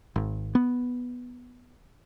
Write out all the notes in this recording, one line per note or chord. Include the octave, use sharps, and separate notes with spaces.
G#1
B3